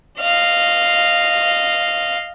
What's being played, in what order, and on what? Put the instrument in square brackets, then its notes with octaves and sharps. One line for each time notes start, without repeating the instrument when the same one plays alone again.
[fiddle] D#5 F5